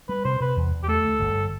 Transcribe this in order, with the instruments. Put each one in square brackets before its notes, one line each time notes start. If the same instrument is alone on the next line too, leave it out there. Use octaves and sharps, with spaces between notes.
[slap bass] G3 [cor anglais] B4
[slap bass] C3 [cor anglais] C5
[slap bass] C3 [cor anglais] B4
[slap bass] E2
E2
[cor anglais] G4
[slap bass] A3 [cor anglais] A4
[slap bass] D2
G1